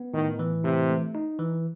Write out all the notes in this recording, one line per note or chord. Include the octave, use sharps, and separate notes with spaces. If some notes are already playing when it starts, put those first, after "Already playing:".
Already playing: B3
A2 D#3
E3
A2 C3
A3
D#4
E3